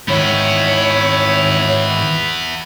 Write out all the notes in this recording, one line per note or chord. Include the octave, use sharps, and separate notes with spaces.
G#2 D#3 B3 E4 C#5